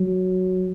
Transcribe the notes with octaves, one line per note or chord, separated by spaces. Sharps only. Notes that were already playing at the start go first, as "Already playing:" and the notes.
Already playing: F#3